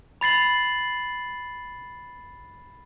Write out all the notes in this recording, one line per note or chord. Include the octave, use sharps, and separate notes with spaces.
B5 A6 C7 F#7